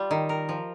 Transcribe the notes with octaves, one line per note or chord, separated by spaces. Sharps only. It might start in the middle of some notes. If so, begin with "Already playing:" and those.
Already playing: G3 F4
D#3
A#4
F3